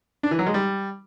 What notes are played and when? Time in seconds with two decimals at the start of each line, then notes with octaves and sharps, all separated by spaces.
0.23 D4
0.31 E3
0.39 F#3
0.46 G#3
0.54 G3